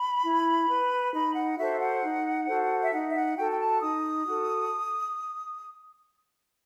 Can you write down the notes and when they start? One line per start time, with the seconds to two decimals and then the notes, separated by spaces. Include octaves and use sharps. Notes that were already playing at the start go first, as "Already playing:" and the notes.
Already playing: B5
0.24 E4
0.69 B4
1.13 D#4 B5
1.35 F#5
1.58 F#4 A4 C5 E5
1.80 F#5
2.02 D#4
2.47 F#4 A4 C5
2.82 E5
2.91 D#4 F#5
3.10 E5
3.14 F#5
3.37 F#4 A4 G5
3.51 G5
3.59 A5
3.81 D#4 D#6
4.25 F#4 A4